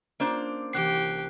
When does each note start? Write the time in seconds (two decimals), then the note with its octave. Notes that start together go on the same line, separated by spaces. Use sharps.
0.20 A#3 C#4 D4 F4 C5
0.73 C2 E3 G4 F#6 C7